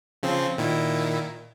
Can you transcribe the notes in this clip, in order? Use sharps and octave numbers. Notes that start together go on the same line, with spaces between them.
C#3 F3 C4
A#2 D#3 E4